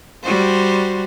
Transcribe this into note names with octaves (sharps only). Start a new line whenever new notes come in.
G3 F#4 C5